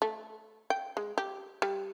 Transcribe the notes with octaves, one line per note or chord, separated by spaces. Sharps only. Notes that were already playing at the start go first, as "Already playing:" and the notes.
A3
G5
G#3
G4
G3